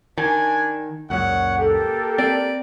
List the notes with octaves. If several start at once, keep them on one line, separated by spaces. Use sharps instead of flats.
D#3 D4 G#5
C#2 F#2 A#2 C#5 F#5
A#3 G4 A4
C4 D5